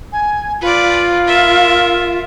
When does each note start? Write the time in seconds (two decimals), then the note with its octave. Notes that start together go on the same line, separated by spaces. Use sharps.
0.13 G#5
0.61 F4 B4 D5
1.27 A#4 E5